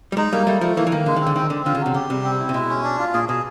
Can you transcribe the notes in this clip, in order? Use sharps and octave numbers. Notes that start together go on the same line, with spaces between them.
G3
G#3 D#4
G3 A#3
G3 A3
F3 A3
E3 A#3
E3
D#3 A#3
D3 G#3
D#3
C4
D3
D#3 C4
D3 C4
D3 F4
C#3
F#3
C3
C#3 G4
C3 G3
C4
E4
C3
B2 G#3
C#4
D4
F4
A#2 G#4
B2 G#4